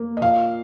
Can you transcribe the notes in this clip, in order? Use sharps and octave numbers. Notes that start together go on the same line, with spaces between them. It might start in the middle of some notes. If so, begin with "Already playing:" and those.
Already playing: A#3
D#5
A#2 F5